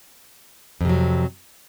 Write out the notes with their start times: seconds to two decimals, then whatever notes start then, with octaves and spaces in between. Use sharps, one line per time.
0.81 F2
0.85 C3
0.89 F#3